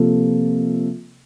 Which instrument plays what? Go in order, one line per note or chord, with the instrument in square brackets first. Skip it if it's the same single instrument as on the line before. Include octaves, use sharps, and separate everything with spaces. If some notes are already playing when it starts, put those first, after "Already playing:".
Already playing: [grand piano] C3 F3 A#3 F4 A4